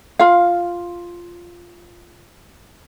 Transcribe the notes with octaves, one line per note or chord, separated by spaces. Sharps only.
F4 F5